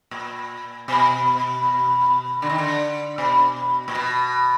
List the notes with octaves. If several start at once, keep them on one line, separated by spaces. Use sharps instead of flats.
A#2
B2
D3
D#3
D3
B2
A#2
B2